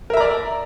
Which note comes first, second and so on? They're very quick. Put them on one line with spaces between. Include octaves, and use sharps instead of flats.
A#4 E5 A#5 D5